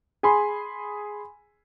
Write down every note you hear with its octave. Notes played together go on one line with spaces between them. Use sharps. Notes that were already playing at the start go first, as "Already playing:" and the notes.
G#4 G#5 B5 C6